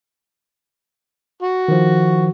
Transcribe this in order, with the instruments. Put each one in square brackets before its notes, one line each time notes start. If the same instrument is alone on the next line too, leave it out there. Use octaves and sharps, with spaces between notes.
[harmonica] F#4
[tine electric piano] D#3 F3